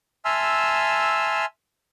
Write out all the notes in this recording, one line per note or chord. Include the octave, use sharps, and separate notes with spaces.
E5 G#5 A5 C6 E6 F6